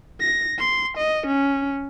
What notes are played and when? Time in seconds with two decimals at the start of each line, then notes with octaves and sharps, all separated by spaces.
0.20 A#6
0.59 C6
0.97 D#5
1.27 C#4